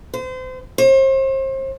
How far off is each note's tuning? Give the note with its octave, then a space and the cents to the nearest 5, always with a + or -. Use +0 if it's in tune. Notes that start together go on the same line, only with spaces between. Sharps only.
C5 -35
C5 +35